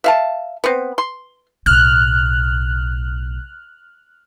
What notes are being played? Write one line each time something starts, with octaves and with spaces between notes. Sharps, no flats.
E5 F5 A5
B3 C4
C6
B1 A2 F6 F#6